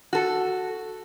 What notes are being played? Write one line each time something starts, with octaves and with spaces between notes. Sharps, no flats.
F#4 A4